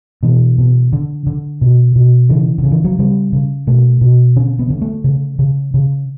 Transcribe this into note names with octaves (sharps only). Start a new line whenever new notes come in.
B2 E3
B2
D3
D3
B2
B2
C#3 E3
D3
C#3
E3
F#3
C#3 G3
C#3
B2 A3
B2
D3 C#4
B3
D3
A3
C#3
C#3
C#3